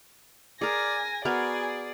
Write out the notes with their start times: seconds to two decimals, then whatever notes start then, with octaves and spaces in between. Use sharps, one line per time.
0.61 G#4 A#4 D5 G#5 A#6
1.25 B3 F#4 G#4 A#4 D5 G#5